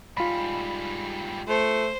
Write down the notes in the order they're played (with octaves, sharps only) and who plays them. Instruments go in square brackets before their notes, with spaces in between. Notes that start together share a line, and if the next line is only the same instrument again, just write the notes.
[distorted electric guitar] G#2 G3 [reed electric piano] F4 B5
[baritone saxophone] A3 [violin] C5